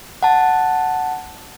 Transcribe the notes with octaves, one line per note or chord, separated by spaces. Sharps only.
F#5 A5